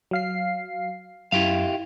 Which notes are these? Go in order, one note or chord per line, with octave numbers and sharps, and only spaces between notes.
F#3 F5 C7
F#2 E4 G4 F5